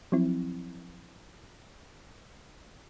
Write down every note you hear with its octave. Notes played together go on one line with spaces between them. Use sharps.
F3 F#3 C4 E4